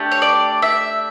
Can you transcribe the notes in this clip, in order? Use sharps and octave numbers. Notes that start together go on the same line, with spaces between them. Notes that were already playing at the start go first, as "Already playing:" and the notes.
Already playing: A3 D4 G4
C#5
D5
E5